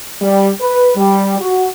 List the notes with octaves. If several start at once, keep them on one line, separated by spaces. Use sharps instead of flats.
G3
B4
G3
F#4